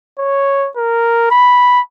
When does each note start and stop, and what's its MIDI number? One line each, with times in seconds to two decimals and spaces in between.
0.19 0.68 73
0.77 1.31 70
1.31 1.80 83